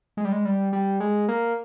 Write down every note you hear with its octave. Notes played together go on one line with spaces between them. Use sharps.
G#3
G3
G#3
G3
G3
G#3
A#3